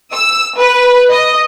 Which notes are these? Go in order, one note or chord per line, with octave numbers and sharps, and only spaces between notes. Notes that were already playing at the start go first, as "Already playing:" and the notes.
E6
B4
D#5